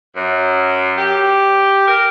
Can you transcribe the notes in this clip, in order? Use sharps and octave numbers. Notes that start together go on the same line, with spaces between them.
F#2
G4
A#4